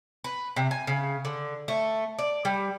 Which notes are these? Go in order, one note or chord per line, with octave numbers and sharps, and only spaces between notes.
B4
C3
G#5
C#3
D3
A3
D5
G3